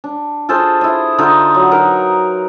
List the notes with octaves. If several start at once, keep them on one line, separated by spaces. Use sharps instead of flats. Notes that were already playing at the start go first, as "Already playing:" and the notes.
D4
F4 G#4 A4 C5
E4 D#5
D3 D#4 F4 A4
F#3
D#4 A#4 B4